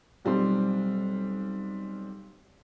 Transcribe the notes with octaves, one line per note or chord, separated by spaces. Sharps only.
B1 G3 C4 C6